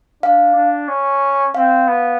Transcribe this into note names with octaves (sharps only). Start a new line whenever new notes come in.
D4 F5
D4
C#4
C4 F5
B3